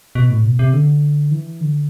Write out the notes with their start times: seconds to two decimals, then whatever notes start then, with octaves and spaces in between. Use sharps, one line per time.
0.15 B2
0.30 A2
0.44 B2
0.59 C3
0.73 D3
1.31 E3
1.61 D3